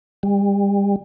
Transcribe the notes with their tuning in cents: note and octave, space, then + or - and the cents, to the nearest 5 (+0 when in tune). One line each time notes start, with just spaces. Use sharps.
G3 +35